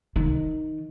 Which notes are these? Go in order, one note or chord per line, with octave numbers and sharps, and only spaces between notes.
D#3